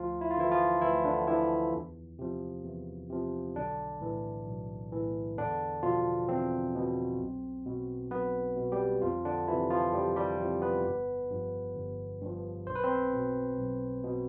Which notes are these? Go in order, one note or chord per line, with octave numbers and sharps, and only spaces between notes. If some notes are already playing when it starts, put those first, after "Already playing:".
Already playing: D2 F3 F4
E4
F4
D3 E3 F3 E4
F3 F4
D2 E3 E4
D3 D4
D3 E3 F3 E4
E2
C3 F3
E2
C3 F3
B1 D3 D4
A2 E3
B1
A2 E3
E2 D3 D4
B2 F3 F4
E2 C4
B2
B1
B2
B1 B3 B4
B2
G3 G4
F2 F3 F4
D3 D4
C3 E3 F3 E4
F3 F4
F2 G3 G4
G3 G4
C3 F3
B3 B4
G1
G2 F3
G1
G2 F3
B1 C5
B4
C4 C5
B2
B1
B2